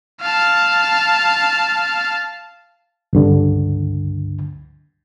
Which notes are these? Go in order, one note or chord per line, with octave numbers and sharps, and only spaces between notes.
F5 A5
C#2 G2 D3